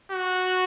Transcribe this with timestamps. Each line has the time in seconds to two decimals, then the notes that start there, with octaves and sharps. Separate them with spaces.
0.12 F#4